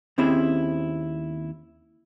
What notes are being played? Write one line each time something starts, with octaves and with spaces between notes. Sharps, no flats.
D#2 C4 C#4 E4 G#4 C5